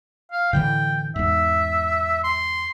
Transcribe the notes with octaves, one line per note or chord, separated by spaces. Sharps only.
F5
A2 D3 E3 G5
E2 G#2 E5
C6